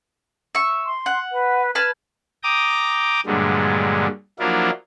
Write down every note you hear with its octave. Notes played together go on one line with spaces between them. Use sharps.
E5 C#6
C6
F#5
B4
B4 A5 F6 G#6
G5 A#5 D6 D#6
G2 A#2 D3 F#3 G#3
F3 F#3 A#3 D4 E4 F4